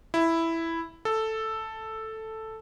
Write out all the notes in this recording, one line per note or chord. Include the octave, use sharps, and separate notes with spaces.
E4
A4